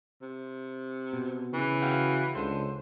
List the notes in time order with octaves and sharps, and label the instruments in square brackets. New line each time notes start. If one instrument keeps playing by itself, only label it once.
[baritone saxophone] C3
[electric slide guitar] B2
[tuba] C#3 [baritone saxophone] E3
[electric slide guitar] F#4 F5 G5
[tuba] C#2 [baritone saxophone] D3 [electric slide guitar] C5